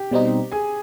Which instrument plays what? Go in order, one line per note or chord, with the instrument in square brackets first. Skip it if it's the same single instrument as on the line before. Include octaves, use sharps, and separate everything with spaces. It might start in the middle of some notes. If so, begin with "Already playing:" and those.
Already playing: [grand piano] G4 G5
[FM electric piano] B2 G3 C4 D#4
[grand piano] G#4 G#5